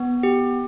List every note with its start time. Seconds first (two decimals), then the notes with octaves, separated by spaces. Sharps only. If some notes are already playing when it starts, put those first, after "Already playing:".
Already playing: B3
0.23 G4